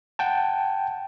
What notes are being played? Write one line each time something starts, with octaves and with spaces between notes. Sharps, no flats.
F#5 G5 A5